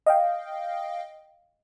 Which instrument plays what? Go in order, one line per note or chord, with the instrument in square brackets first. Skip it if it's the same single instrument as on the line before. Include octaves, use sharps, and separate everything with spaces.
[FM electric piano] D#5 F5 G5